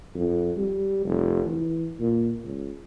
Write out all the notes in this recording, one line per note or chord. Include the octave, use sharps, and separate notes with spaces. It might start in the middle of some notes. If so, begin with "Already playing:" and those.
F2
G3
F1
E3
A#2
C#2